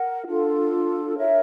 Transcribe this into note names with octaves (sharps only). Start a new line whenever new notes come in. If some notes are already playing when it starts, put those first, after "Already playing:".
Already playing: A#4 F#5
D4 F4 A4
A#4 C#5 E5